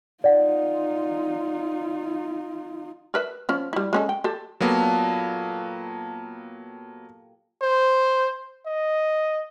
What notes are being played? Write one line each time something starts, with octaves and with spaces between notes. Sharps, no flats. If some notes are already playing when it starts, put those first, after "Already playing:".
D#4 F4 D5 F#5
A#4 B4 E5
F3 C#4
G3 E4
G#3 C#4 A4
G5
G4 A4
A#2 F#3 A#3 B3 G4 A4
C5
D#5